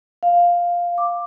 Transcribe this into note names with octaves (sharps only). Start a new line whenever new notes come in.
F5
D6